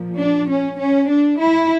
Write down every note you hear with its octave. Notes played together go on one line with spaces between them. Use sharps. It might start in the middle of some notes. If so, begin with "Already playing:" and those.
Already playing: A#2 F3
D4
C#4
C#4
D4
E4